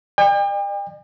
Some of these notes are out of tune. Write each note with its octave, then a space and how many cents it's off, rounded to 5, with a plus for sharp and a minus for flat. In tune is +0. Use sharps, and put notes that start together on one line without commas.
D5 +45 G5 +40